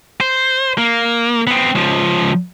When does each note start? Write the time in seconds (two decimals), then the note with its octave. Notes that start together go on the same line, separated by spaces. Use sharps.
0.21 C5
0.78 A#3
1.47 B3 C4
1.75 C#2 F3